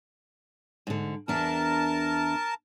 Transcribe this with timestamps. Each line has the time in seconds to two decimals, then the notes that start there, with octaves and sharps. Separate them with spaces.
0.87 G#2 D3
1.28 E2 D4 A#4 E5 A5